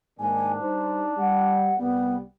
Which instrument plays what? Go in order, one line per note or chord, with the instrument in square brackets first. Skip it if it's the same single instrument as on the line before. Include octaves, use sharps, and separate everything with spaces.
[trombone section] G#2 D#3 A#3 [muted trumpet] D4 [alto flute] G#5
[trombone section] G3 C5 [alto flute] D#4
[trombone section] G3 [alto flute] F#5
[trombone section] C2 G3 [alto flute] B3